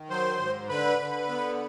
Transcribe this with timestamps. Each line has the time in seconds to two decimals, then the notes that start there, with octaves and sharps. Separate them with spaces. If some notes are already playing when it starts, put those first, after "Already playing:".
Already playing: D#3
0.10 F#3 C5 C6
0.40 G#2
0.69 D3 B4 B5
0.99 D3
1.29 B3